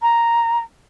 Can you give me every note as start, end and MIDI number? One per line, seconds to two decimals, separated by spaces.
0.02 0.60 82